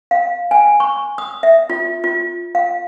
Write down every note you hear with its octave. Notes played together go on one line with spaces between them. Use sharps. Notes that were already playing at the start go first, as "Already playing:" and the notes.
F5
G#5
C#6
D#6
E5
F4
F4
F5